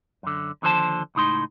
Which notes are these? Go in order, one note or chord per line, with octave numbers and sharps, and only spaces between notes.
F#2 D3
D#2 D3 F3 C5 A5
C#2 A2 D#4 C6